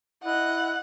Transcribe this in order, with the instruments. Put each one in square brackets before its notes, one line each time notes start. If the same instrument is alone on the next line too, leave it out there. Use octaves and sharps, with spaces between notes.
[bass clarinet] E4 [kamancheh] D#5 F#6 [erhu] F#5